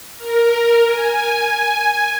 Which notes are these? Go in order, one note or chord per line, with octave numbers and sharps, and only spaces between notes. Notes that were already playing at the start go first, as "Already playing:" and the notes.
A#4
G#5